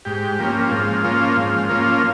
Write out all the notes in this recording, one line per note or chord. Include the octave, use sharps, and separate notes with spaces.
G#2 G4
F3 A#3 C#4
G#2 F4
F3 A#3 C#4
G#2
F3 A#3 C#4